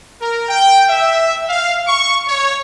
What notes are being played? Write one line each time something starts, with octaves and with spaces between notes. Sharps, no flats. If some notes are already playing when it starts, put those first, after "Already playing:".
A#4
G5
E5
F5
C#6
C#5